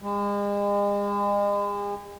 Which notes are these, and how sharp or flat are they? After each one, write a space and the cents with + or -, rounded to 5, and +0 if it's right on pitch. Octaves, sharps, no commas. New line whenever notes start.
G#3 -40